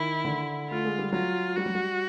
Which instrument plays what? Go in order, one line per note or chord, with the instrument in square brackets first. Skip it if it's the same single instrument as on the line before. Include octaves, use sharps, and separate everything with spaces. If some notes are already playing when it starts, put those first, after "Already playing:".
Already playing: [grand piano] D#3 [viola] E4
[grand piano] D3
[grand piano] A3 [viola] F4
[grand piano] G#3
G3
[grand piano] F#3 [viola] F4
[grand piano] G3 [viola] F#4
[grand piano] F#3
G3